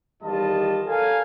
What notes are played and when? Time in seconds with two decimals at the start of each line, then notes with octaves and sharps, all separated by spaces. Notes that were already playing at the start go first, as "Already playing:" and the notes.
0.22 E2 D#3 G3 F4 D#5 A5
0.85 A4 A#4 C#5 F5 G#5